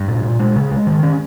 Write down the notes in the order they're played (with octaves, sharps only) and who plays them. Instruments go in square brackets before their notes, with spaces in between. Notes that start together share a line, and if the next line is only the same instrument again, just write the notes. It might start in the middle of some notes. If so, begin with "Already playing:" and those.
Already playing: [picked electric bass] G2
A#2
A#2
G#3
C#3
G#3
D#3
C#4